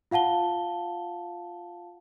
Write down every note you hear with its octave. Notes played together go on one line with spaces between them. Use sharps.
F4 F5 F#5 A5 G7